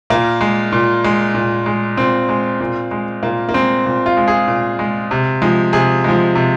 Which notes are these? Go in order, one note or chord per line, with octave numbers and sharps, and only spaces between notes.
A#2 A#3
G#3
A#2
G#3
A#2
G#3
A#2 C4
G#3
A#2
G#3
A#2 A#3
A#3
G#3 C4
A#2
F4
G#3
G#4
A#2
G#3
C3
F3 G#3
C3 G#4
F3 G#3
C3